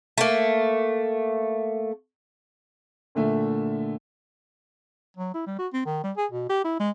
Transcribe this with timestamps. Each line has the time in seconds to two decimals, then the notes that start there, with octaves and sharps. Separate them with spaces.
0.18 A3 A#3
3.15 A#2 D3 A3 E5
5.17 F#3
5.34 E4
5.47 G3
5.59 F#4
5.73 C4
5.86 D#3
6.03 G3
6.17 G#4
6.31 B2
6.49 G4
6.64 E4
6.80 G#3